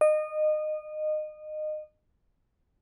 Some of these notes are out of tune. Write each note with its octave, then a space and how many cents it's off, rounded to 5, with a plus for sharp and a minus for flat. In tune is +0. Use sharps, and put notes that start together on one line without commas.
D#5 -25